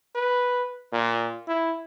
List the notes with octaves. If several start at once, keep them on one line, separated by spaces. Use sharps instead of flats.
B4
A#2
E4